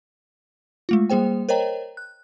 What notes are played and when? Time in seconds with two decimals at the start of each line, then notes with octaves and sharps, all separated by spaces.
0.89 G#3 A3 F4
1.10 G3 A#3 G#4 C5 G5
1.49 A#4 C5 C#5 D#5 G5 A#5
1.97 F#6